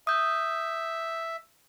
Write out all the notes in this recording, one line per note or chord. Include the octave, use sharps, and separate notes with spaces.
E5 D#6 G6